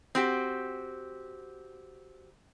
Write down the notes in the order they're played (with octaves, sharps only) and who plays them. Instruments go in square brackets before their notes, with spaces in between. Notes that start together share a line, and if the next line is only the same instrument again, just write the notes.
[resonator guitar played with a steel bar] C4 F#4 G4